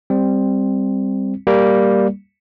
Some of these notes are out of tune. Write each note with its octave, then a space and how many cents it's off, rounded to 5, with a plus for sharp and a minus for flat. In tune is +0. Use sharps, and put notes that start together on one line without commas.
G3 +10 C4 +0
G3 +0 A#3 +0